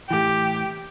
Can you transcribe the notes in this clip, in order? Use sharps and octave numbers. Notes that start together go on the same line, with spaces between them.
A2 E3 G4